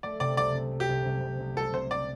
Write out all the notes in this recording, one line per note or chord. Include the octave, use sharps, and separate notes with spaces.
A3 D5
C3 D5
C2 D5
C2
A3
G4
C2
C2
C2
C2
C2 A4
C2 C5
C3 D5